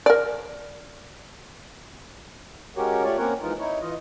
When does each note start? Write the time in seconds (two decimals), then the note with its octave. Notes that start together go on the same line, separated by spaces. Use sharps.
0.06 A#4 D5
2.77 G#3 C#4 F#4 G4 A#4 C#5
3.04 A3 F4 G4 C#5 D5
3.18 A#3 C4 C#4 A#4 C#5 F#5
3.41 E3 F3 G#3 D#4 F4 A#4
3.59 D#4 E4 C#5
3.81 E3 F4 D#5